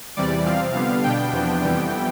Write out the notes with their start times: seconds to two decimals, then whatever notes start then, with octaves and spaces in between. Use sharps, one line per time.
0.16 E2 C3 E3 G3 D5
0.46 C3 F3 C4 F5
0.74 D3 G3 B3 F5
1.04 B2 B3 D4 G5
1.32 E2 C3 F3 B3 D4
1.62 F2 E3 G3 B3